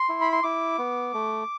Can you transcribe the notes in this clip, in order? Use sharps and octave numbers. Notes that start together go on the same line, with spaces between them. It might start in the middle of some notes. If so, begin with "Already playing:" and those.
Already playing: C6
E4
B5
C6
E4 D6
B3
A3